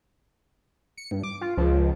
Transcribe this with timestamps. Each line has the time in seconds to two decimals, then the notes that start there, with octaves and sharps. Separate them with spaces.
0.98 C#7
1.11 G2
1.23 D6
1.41 F4
1.57 C#2 F3